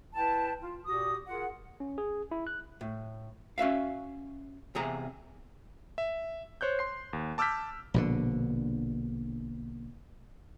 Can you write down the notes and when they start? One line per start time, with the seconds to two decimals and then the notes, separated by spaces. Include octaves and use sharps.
0.14 E4 B4 G5 A5
0.62 F4
0.85 A#2 F#4 G4 D#6
1.28 F4 G#4 A#4 F#5
1.80 C#4
1.98 G#4
2.31 E4
2.47 F#6
2.81 A2
3.58 C#4 F#4 E5 F5
4.75 E2 C3 G#4 A#5
5.98 E5
6.61 C5 C#5 F#6 G6
6.79 C6 C7
7.13 D#2
7.38 A5 D6 E6 F6 G6 B6
7.94 A#1 B2 D3